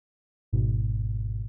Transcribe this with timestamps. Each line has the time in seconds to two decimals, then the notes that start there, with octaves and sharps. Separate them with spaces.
0.53 G#1 G#2 B2